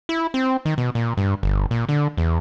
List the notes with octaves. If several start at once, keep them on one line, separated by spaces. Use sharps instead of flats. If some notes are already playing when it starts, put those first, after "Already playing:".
E4
C4
D#3
B2
A#2
G2
G1
A#2
D3
E2